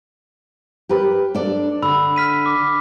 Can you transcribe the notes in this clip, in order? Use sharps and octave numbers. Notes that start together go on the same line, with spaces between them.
G4 A#4 B4
D4 A4 D5
D3 B5 E6
F6 B6 D#7
D6